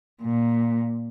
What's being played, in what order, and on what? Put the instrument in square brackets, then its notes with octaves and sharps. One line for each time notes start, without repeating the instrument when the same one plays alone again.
[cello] A#2